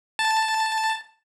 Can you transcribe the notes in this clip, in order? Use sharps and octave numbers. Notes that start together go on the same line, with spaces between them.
A5